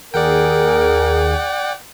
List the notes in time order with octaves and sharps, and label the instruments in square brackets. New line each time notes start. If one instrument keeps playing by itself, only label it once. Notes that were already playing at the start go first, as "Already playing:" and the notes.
[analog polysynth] D#2 G#4 [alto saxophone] A#4 [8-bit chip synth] D5 F#5 G5